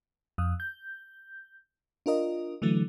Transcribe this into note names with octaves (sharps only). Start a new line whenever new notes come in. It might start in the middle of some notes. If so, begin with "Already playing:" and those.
F2 D#6
G6
D4 F4 A#4 D#5
D3 E3 F#3 A3